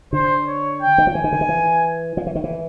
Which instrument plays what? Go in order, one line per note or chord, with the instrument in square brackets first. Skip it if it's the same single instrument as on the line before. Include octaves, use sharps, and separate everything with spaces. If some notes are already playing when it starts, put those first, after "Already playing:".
[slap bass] D3 [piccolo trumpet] C5
[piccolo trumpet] C#5
G5
[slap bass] D#3
F3
[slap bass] E3 [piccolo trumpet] G#5
[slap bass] D#3
D3
D#3
E3
F3
E3
D#3
E3